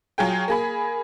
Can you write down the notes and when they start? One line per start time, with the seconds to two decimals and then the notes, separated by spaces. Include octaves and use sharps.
0.18 F#3 F4 G#4 G5
0.48 A#3 G#4 B5